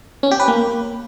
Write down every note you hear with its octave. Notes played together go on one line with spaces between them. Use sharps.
C#4
G4
B4
A#3